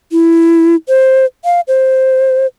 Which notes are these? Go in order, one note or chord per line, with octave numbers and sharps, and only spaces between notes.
E4
C5
F5
C5